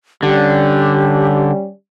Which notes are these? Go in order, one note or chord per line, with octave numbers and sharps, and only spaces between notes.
D3 G3 C#4 G4